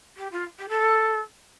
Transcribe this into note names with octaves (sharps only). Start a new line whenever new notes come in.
G4
F4
G4
A4